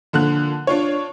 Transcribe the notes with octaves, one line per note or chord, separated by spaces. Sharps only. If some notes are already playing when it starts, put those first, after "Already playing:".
A#2 D3 F3 F#6
D4 F4 C#5